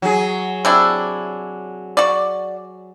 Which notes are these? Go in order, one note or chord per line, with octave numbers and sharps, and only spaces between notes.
F#3 G#4
C3 D4 E4
F#4 D5